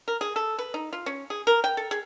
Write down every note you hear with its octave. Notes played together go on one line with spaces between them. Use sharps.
A#4
G#4
A4
B4
D#4
F4
C#4
G#4
A#4
G5
A4
G#4